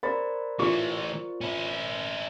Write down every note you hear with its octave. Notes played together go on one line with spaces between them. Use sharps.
A#4 C5 D5 B5 A6
E3 A3 F4 C#6
C#4 E4